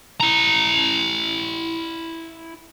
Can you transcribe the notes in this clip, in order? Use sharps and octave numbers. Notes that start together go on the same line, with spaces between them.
E4 A#5